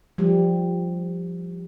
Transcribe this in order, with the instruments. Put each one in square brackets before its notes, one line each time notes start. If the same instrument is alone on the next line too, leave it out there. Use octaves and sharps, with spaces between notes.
[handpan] F3 G3